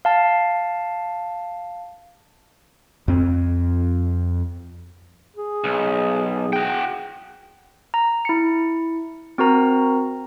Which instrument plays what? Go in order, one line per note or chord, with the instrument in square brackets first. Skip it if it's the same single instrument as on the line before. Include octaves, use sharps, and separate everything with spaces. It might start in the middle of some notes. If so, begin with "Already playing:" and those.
[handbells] F5 A5
[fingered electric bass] F2 C4
[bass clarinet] G#4
[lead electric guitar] B1
[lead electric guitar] F#4 G5 [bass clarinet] G#4
[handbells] A#5
E4 C#7
C4 F#4 A#4 A#5